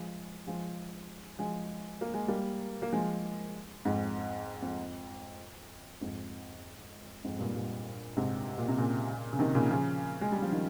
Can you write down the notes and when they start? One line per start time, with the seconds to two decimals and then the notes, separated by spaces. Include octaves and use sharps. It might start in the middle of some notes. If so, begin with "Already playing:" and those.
Already playing: F3 G#3
0.46 F3 G#3
1.39 F3 G#3
2.01 A#3
2.14 G#3
2.28 G3 A#3
2.82 A#3
2.93 F3 G#3
3.85 F2 G#2
4.62 F2
6.01 F2 G#2
7.24 F2 G#2
7.39 G2 A#2
7.55 G2 A#2
8.17 G#2 C3
8.58 A#2
8.68 C3
8.77 A#2 C#3
9.33 C#3
9.39 C3 D#3
9.55 A#2 C#3
9.70 C#3 F3
10.21 G#3
10.32 G3
10.42 F3
10.52 D#3